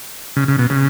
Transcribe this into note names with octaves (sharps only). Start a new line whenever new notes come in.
C#3
C#3
B2
C#3